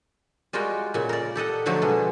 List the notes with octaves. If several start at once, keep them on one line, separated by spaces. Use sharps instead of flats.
G3 G#3 F4 F#4 A#4 G5
A#2 C#3
A#4 D5
G4 A4 D#5 F#5
D3 F3 F#3 A3 G4
B2 G#3